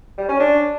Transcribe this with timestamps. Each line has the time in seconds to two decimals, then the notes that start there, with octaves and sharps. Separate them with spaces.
0.17 G3
0.29 C#4
0.40 D4